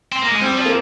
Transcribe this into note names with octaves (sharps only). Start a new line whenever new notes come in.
C4
A#3
G#3
G3 C4
F3
A#3